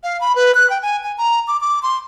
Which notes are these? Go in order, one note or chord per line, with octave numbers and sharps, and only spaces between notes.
F5
B5
B4
F#6
G5
G#5
G#5
A#5
D6
D6
C6